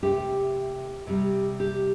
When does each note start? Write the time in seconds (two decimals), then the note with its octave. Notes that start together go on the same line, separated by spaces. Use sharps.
0.03 C3 A3 G4
1.07 C3 G3
1.60 G4